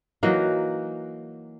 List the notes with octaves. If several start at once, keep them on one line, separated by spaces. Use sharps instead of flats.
E3 F#3 A#3 D#4